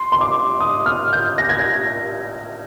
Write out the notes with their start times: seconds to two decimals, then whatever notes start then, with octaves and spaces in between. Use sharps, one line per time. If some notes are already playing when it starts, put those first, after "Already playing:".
Already playing: C6
0.12 C6
0.21 D6
0.60 D#6
0.86 F6
1.13 G6
1.38 A#6
1.49 G#6
1.59 A#6